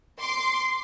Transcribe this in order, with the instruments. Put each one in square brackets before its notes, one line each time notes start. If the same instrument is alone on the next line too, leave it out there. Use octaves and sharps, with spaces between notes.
[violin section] C6 D6 C7